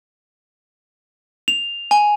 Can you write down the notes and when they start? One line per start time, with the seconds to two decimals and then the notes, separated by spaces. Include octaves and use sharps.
1.48 F7
1.91 G#5